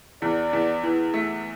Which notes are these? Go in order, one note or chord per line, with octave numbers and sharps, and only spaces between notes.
E2 D5
E2
E3
A3